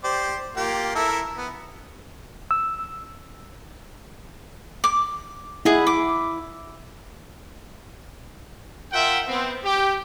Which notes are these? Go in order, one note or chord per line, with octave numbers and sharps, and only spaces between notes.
G4 C5 D5
A#3 F4 G4
E4 A4 A#4
B3
E6
D6
E4 G#4 D#5 F#5
D6
F4 A#4 E5 F#5 G5
B3 C4
G4